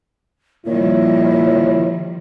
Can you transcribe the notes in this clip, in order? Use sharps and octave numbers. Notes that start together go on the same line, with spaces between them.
A#2 D#3 F3 G3 E4 C#5